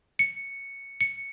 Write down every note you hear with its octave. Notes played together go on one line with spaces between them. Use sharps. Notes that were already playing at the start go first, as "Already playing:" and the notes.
C#7
C#7